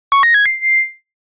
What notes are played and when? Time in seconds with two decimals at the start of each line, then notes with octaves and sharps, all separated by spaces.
0.12 C#6
0.23 A#6
0.34 G#6
0.46 C7